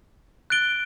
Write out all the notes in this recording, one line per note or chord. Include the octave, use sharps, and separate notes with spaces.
F#6 A6 D7 G7